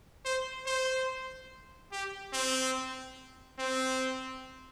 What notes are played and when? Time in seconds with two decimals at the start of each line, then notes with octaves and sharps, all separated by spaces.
0.25 C5
0.66 C5
1.92 G4
2.33 C4
3.59 C4